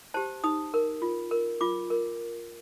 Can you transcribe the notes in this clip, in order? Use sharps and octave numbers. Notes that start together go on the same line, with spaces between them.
G4 C5 A5
D#4 D#6
A#4
F4
A#4
F4 D6
A#4